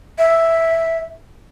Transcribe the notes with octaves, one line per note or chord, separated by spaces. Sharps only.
E5